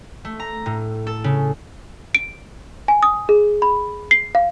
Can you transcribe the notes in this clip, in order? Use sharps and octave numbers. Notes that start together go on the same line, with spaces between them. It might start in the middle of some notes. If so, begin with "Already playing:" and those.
A3
A#5
A2
A4
C#3
D7
G#5
D#6
G#4
B5
C7
F5